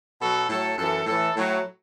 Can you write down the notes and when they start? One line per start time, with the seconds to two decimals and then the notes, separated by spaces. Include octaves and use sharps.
0.21 B2 F#3 A4
0.49 A2 F#3 A4
0.78 F#2 E3 A4
1.06 A2 E3 A4
1.36 A2 F#3